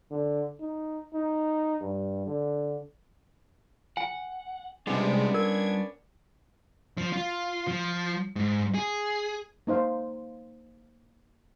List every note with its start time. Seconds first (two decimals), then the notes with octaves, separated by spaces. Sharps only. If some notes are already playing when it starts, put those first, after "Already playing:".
0.11 D3
0.61 D#4
1.14 D#4
1.81 G2
2.27 D3
3.97 F#5 G#5
4.87 C3 G3 G#3 B3 C#4 D4 F4
5.34 A#4 G#6
6.98 F3
7.13 F4
7.68 F3
8.36 G#2
8.75 G#4
9.67 A#3 D#4 C5 F5